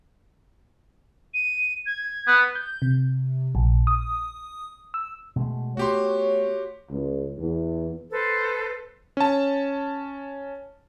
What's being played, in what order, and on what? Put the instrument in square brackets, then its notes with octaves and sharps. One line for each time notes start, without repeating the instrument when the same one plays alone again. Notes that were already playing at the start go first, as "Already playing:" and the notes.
[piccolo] D#7
G#6
[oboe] B3
[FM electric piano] G6
C3
A#1
D#6
E6
[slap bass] B2 G#3 A3
[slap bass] A3 B3 [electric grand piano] F#4 G4 C6 [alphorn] C#5
[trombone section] C#2
E2
[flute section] A4 B4 C5
[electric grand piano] C#4 A5